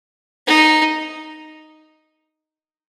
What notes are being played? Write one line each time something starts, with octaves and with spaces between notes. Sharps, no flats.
D#4